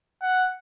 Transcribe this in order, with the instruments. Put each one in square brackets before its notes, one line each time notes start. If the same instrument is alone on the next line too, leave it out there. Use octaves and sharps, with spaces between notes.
[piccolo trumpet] F#5